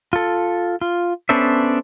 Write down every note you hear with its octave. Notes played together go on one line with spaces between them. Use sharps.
F4 A4
F4
B3 C#4 D4 A4 C5 E5